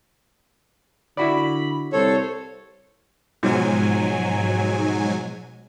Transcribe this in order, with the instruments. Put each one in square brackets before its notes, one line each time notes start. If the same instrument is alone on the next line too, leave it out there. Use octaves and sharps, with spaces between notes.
[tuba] D3 [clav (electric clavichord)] E4 F#4 D5 [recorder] B5
[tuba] C2 [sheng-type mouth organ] A4 C#5 [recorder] C5
[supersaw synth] G#2 F#3 G#5 [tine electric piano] B2 F3 G#3